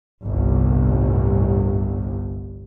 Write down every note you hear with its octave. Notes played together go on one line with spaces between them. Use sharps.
G1 C2 A2